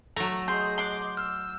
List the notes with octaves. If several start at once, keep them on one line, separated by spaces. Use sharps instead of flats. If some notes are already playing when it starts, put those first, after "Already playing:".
F#3 A3 A#5
G#4 D#5 C6 G6
C6 D6 F#6
E6 F6